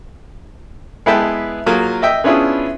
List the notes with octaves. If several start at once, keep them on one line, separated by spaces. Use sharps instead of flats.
G#3 B3 E4 B4 G5 A5
F#3 A#3 F4 G#4 A#4
D#5 E5 G5
B3 C#4 D4 E4 F4 G#4